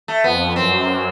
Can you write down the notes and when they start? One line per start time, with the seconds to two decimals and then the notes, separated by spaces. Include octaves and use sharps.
0.08 A3
0.24 F2 B3
0.56 F#2 C4